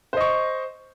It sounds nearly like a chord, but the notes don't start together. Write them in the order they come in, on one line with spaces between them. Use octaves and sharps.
C5 D#5 C#6